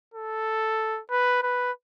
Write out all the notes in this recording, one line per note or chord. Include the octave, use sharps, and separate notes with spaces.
A4
B4
B4